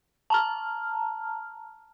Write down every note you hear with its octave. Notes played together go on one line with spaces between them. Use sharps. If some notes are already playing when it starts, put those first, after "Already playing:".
A5 A#5 F6